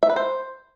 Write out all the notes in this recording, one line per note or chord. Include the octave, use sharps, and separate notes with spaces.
E5
B4
C5